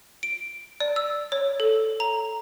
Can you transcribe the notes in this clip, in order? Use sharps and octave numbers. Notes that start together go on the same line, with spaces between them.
D7
D5
E6
C#5
A4
A#5